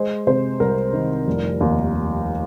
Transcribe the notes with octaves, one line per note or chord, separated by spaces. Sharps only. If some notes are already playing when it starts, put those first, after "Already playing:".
Already playing: G#3 C5
C3 C5
C2 A#4
D#3
F1
D#2